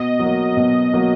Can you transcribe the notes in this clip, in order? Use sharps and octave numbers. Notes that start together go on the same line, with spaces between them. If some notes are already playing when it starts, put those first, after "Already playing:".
Already playing: B2 D#5
F#3 A#3
B2
F#3 A#3